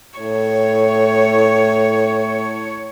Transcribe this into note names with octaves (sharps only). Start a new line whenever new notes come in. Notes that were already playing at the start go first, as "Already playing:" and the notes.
A2 C#5